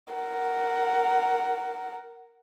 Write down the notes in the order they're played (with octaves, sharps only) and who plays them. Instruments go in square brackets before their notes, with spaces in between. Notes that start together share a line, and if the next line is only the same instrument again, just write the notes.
[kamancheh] A#4 F#5